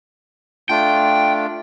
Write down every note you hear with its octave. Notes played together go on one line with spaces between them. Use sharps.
A3 D4 F4 G5